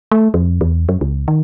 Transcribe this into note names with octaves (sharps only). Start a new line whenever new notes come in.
A3
F2
E2
F#2
C#2
D#3